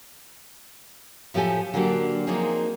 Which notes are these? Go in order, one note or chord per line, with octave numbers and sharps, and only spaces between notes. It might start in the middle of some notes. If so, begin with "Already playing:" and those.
A2 F3 A3 G4 A4 G#5
D3 F#3 A#3 D4 F#4 G4
F3 F#3 A#3 C4 D#4 G#4